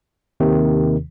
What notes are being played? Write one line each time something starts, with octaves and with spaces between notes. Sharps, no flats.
D#2 C3 D#3